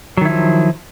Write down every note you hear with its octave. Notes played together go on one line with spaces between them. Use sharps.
D#3 F3 F#3 E4